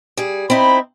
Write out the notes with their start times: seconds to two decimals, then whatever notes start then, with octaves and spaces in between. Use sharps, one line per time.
0.17 G3 G#4
0.50 C4 D#4 E4 B5